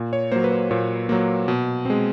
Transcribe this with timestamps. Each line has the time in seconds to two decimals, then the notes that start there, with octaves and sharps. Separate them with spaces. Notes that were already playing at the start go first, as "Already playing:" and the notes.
Already playing: A#2
0.13 C#5
0.32 F#3 A#3 C5
0.44 B4
0.52 C5
0.71 A#2 C#5
1.09 F#3 A#3
1.48 B2
1.85 G#3 C4